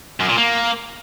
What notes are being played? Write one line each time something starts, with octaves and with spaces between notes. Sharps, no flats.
F#2
A#2
A#3